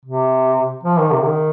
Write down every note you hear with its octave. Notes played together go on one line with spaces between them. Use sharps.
C3
F3
D#3
C3
D#3